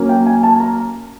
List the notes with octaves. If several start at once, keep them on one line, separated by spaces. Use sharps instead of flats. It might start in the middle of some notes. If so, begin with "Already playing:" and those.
Already playing: F#3 A#3 C#4
G5
G#5
A5
A#5